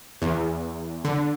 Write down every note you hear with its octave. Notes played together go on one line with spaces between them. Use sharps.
E2
D3